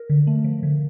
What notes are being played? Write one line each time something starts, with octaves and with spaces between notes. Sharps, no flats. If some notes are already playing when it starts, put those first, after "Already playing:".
Already playing: A#4
D3
A3
F3
D3